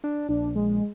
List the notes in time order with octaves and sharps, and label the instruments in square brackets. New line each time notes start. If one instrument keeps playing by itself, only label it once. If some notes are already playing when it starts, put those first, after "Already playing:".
[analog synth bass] D4
[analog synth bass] A#1 [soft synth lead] D4
[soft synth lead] G#3